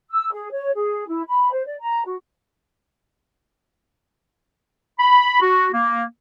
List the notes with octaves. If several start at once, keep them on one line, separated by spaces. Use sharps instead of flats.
E6
G#4
C#5
G#4
E4
B5
C5
D5
A#5
F#4
B5
F#4
A#3